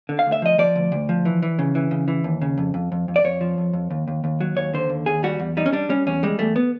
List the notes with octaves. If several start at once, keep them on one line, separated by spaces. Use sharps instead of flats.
D3
F5
D2
E5
F3 D#5
F3 D5
D2
D2
F3
E3
E3
C#3
E3
C#3
E3
D#2
C#3
F2
F2
F2
F2
D5
F2 C#5
F3
F2
F2
D#2
D#2
D#2
F#3
D#2 C#5
D3 C5
D#2
D#2 G#4
G3 F#4
E2
G3 D#4
C#4
G3 D4
G3 C#4
E2 C#4
G3 G#3
E2 A3
B3